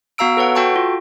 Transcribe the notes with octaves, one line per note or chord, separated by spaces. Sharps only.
B3 F#4 F5 A#5 E6 D7
A4 B4 C#5 F#5
F#4 A4 G5 A5 C#6
F4